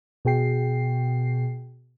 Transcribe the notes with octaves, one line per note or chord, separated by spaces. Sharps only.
B2 F#4 G#4 G5 C7